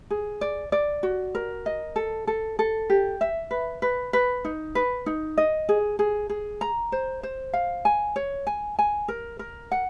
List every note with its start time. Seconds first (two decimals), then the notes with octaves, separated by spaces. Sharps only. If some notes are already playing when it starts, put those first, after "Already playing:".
0.10 G#4
0.41 D5
0.72 D5
1.03 F#4
1.35 A#4
1.66 D#5
1.96 A4
2.27 A4
2.59 A4
2.90 G4
3.21 E5
3.51 B4
3.82 B4
4.13 B4
4.45 D#4
4.75 B4
5.06 D#4
5.38 D#5
5.69 G#4
5.99 G#4
6.30 G#4
6.61 A#5
6.92 C5
7.23 C5
7.53 F5
7.85 G#5
8.16 C#5
8.47 G#5
8.79 G#5
9.08 A#4
9.39 A#4
9.72 F#5